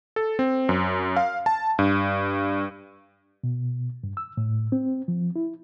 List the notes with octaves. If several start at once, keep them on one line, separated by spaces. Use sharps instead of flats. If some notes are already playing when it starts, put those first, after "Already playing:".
A4
C4
F#2
F5
A5
G2
B2
G2
E6
A2
C4
F3
E4